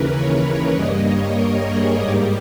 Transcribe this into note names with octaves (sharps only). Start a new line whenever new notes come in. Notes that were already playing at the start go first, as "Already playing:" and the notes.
Already playing: D#2 C#3 E3 A#4 B4
C#5
C#5
G2 G3 A#3 D#5
C#5
A#4
G#4
G#2 G3 A#3 G4